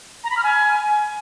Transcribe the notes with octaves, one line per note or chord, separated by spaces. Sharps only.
A#5
B5
F6
G#5